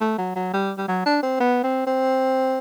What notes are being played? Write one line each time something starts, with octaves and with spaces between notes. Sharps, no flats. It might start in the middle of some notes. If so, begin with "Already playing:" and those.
A3
F#3
F#3
G3
G3
F#3
D4
C4
B3
C4
C4